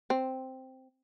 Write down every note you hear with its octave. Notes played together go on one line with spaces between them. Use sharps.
C4